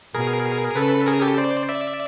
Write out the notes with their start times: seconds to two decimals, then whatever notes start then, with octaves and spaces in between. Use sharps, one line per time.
0.14 B2 G#4 A#4
0.76 C#3 A4 B4
1.06 G#4 A#4
1.22 G4 A4
1.38 C5 D5
1.68 D5 E5